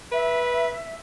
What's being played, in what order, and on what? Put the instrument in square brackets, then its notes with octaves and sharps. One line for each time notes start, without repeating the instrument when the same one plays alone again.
[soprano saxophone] B4 [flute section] E5